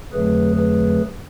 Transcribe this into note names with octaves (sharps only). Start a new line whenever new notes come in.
F2 D3 F#3 A3 G#4 B4
G#4 B4